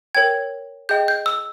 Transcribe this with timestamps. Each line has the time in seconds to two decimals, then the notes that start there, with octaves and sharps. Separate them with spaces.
0.15 A#4 C#5 G5 G#6
0.89 G#4 D#5 G5 G6
1.08 G6
1.26 E6